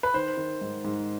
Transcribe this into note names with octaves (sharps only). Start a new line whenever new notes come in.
B4
D#3 C5
D#3
G#2
G#2